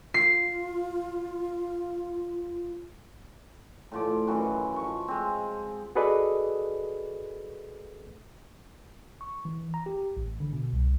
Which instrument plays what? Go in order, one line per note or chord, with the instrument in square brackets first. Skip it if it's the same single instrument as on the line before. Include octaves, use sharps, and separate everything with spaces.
[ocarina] F4 [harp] C7
[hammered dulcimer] A2 F3 D5
F#2 D#3 E3 F#4
F3 C#6
G#3 C4
[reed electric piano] F#4 G#4 A4 B4 D5 D#5
[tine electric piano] C#6
E3
A#5
G4
A1
D3
B2
C2